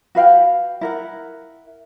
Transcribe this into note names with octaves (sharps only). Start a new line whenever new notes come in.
F#4 B4 F5 G5
E4 A#4 F#5